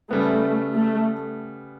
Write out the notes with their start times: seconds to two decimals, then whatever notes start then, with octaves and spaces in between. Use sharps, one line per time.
0.10 C#3 G3 A3 B3
0.75 A3